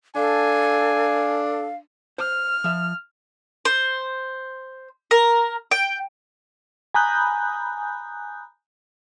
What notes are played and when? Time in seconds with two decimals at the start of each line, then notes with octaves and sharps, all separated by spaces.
0.16 D4 A4 F5 G#5
2.18 C5 F6
2.64 F3 E5
3.65 C5
5.11 A#4
5.71 G5
6.94 G#5 A#5 B5 D#6 F#6 G6